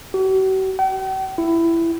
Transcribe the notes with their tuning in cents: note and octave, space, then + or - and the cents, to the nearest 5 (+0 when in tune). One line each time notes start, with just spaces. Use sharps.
F#4 +45
G5 -45
E4 +15